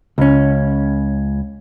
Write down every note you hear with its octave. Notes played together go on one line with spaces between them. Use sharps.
C#2 C#4